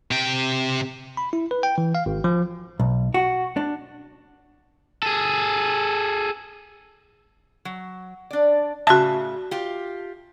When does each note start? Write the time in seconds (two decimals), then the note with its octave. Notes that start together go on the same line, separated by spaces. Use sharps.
0.11 C3 G5
1.17 B5
1.33 E4
1.51 B4
1.63 G5
1.78 E3
1.95 F5
2.06 G#1
2.24 F3
2.80 B1
3.14 F#4
3.57 D4
5.03 G#4 A4
7.65 F#3
8.31 D4 D5
8.87 A2 C#3 F#4 E5 A5
9.51 F4 G4